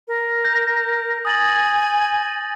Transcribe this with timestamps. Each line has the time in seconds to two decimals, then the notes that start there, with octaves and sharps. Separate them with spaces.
0.08 A#4
0.45 G6 A#6
1.25 G#5 D#6 A6 F#7